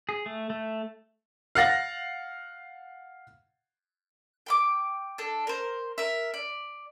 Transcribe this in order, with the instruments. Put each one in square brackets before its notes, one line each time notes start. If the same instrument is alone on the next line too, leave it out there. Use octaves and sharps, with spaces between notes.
[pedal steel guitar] G#4
A3
A3
[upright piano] F5 F#5 A6 A#6
[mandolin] G5 B5 D6
D4 A4
A#4 C5
A#4 E5
D5